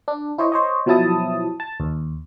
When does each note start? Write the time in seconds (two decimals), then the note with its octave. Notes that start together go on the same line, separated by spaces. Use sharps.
0.08 D4
0.38 E4 C5 C#5 D#5
0.52 C5 C#5 D#5
0.86 B2 F3 F#3 E4 A5 D#6
1.60 A5
1.80 D#2